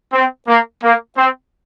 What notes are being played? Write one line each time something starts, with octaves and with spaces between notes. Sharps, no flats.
C4
A#3
A#3
C4